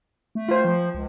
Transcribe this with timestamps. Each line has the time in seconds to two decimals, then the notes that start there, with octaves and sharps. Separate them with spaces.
0.35 A3
0.49 F4 C5
0.64 F3
0.95 C#2